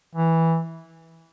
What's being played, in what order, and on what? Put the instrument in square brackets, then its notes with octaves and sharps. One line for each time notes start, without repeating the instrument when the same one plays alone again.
[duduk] E3